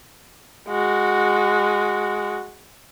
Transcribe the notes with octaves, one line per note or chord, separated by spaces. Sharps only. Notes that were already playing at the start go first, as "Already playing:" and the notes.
G#3 F#4